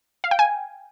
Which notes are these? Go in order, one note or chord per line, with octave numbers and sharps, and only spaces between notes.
F5
G5
G#5